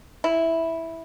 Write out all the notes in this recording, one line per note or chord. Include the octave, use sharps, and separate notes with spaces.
E4